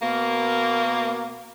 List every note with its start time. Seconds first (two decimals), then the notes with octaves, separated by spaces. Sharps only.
0.01 B2 A#3